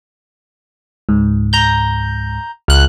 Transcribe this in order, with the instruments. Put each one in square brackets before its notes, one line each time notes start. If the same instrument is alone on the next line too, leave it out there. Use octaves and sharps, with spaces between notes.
[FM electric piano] C#2 G#2
[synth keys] A#5 G6
[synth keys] C#2 F#6 [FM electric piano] F6